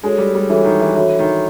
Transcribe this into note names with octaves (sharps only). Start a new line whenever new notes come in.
G#3 D4 F#4 A4 C#5
G3
G3
E3 D4 F#4 A4 C#5
D#3
E3
E3 D4 F#4 A4 C#5
D#3